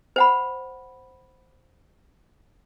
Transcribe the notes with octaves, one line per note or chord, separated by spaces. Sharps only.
C5 F#5 B5